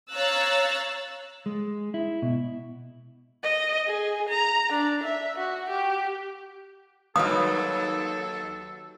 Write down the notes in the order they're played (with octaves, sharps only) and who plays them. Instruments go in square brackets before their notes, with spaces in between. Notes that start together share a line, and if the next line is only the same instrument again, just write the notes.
[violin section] C#5 F5 A#5 E6 F#6 A6
[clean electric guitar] G#3
E4
B2
[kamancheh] D#5
G#4
A#5
D4
E5
F#4
G4
[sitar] D#2 [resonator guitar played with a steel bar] F#3 B4 F5 [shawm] A4 [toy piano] D#6